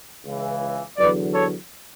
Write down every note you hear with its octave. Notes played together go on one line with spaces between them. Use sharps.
C#2 C#3 E3
E2 D3 F#3 B4 D5
A4 C#5